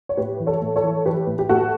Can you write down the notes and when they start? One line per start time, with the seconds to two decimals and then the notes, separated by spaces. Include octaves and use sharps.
0.09 C#5
0.17 A2 G4 B4
0.40 E3
0.47 A4 C#5
0.62 A2
0.76 A4 C#5
0.83 E3
1.06 E3 G4 B4
1.27 A2
1.39 G4
1.49 A2 F#4 A4